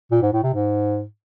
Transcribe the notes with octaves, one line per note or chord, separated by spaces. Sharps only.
A#2
G#2
A2
C3
G#2